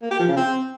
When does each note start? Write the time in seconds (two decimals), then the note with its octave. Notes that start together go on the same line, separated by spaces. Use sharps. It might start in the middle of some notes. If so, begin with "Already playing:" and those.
0.02 A#3
0.11 G4
0.19 F3
0.28 C#3
0.36 C4